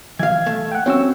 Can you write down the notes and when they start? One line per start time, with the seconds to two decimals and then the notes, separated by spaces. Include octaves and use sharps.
0.19 E3 F5 G#6
0.46 A3
0.72 F#5 G5
0.86 C4 C#4 F#4 E6